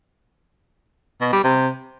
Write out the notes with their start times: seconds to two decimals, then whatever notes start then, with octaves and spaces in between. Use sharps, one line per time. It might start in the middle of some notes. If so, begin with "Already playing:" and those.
1.21 B2
1.32 G3
1.44 C3